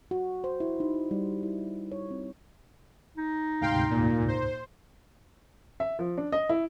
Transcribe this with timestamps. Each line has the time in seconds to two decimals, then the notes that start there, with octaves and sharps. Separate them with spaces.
0.11 F#4
0.44 C5
0.60 E4
0.80 D#4
1.11 G3
1.43 E4
1.92 C#5
2.11 C4
3.17 D#4
3.61 D2 G#2 C3 F5 G5 C6
3.91 A#2
4.28 C5
5.80 E5
5.99 F3
6.18 D4
6.32 D#5
6.49 E4